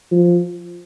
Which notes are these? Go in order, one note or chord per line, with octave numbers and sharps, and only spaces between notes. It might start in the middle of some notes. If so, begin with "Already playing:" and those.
F3